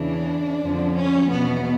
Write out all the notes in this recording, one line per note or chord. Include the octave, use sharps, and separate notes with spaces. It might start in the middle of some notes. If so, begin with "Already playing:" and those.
Already playing: E2 C#3 E3 D4
F2 D3 F3
C#4
E2 B2 B3